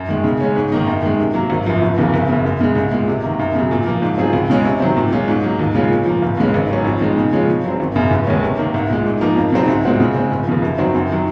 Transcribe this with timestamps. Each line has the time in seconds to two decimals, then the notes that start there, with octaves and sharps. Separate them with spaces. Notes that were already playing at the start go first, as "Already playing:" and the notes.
Already playing: F#2
0.09 D#3 G#3
0.24 C#3
0.41 G#3 C#4
0.56 G#2
0.72 D#3 A#3 D#4
0.87 F#2
1.02 D#3 G#3
1.19 C3
1.34 F#3 A#3
1.50 G#1
1.66 F#2 F3
1.82 F1
1.98 D#2 C#3 F3 A#3
2.14 F#1
2.29 F#2 C#3
2.45 F#2
2.61 C#3 G#3
2.75 C2
2.91 A#2 G#3
3.08 C3
3.23 D#3 A#3
3.39 F#2
3.55 C#3 F#3
3.71 A#2
3.86 F3 A#3
4.02 G#2
4.18 F#3 C4 F4 G#4
4.33 C#2
4.50 C#3 G#3 C#4
4.65 C3
4.80 D#3 F#3 C4
4.97 A#2
5.12 G#3 C#4 F4
5.28 G#2
5.43 F#3 A#3 D#4
5.59 D#2
5.75 C#3 G#3 C#4 F4
5.91 A#2
6.06 F3 A#3
6.22 F1
6.37 D#2 C#3 G#3 C#4
6.54 G#1
6.70 G#2 F#3 C#4
6.85 F2
7.00 D#3 G#3 D#4
7.17 C#3
7.32 F3 G#3 C#4 F4
7.48 C#3
7.64 F#3 C4
7.80 G#1
7.96 F#2 C#3
8.11 F1
8.27 D#2 D#3 G#3 C#4
8.43 C3
8.58 D#3 A#3
8.74 C2
8.90 A#2 G#3
9.05 G#2
9.21 F3 A#3 D#4 A#4
9.36 F2
9.52 C#3 F#3 C4 D#4
9.68 C2
9.84 A#2 G#3 C4 F#4
10.00 C#3
10.15 G#3 C4
10.32 F1
10.47 D#2 C#3 F3
10.62 F#2
10.78 D#3 F#3 C4 F#4
10.95 F#2
11.10 D#3 F#3